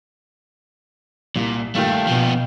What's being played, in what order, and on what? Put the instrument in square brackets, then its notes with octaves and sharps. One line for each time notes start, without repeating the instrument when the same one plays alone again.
[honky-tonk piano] C2 [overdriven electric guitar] A#2
[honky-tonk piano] G2 A#2 D#3 [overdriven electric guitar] A3 [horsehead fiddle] F5 G5
[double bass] B2 [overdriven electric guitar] F3 B3